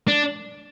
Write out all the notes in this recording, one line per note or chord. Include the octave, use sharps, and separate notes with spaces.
D4